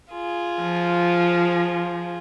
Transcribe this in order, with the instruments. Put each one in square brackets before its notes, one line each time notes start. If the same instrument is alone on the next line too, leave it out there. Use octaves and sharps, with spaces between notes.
[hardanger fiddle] F4 G#4
[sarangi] F3